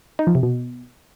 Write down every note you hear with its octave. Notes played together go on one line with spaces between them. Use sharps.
D#4
F3
C3
B2